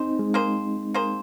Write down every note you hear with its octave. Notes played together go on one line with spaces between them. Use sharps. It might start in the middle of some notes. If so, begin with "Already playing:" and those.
Already playing: C4 D#4 G#4 C5
G#3
A#3 G#4 C5
A#3 G#4 C5